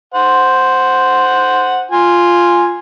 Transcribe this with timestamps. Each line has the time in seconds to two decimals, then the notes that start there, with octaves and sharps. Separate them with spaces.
0.14 C5 F#5
1.91 F4 G#5